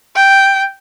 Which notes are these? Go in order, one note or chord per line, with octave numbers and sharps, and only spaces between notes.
G5